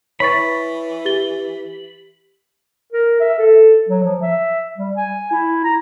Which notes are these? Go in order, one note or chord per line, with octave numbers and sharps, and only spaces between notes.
E3 C#5 B5 C#6 A6
G4 A6 G7
A#4
E5
A4
F#3
F3
E5
G3
G#5
E4
A#5